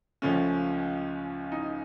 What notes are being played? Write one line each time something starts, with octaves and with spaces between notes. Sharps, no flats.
C#2 C#3 F3 A3 C#4
D#4